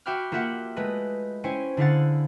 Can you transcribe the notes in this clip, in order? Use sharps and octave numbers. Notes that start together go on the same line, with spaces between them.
F#4 E5 G5 B5 D6 F6
A#3 F4 G4 E5 F#5 G5
G#3 A3 B4 D#5
C#4 E4 C5 C#5 G5 G#5
D3 E4 G#4 F5 F#5 A6